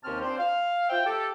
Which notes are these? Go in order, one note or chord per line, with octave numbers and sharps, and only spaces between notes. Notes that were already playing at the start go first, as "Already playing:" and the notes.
D#2 C3 C4 C#4 A5 F6
C4 D4 F4 C5
F5
F4 C5 E5 G5
G4 A4